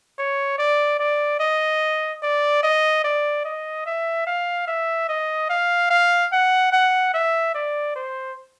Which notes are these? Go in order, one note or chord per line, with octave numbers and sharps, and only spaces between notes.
C#5
D5
D5
D#5
D5
D#5
D5
D#5
E5
F5
E5
D#5
F5
F5
F#5
F#5
E5
D5
C5